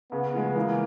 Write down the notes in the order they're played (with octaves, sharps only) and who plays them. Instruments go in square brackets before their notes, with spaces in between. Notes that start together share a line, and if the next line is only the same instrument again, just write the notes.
[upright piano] C#3 [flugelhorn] B3
[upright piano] F3 G#3
[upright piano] E3 [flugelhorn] A#3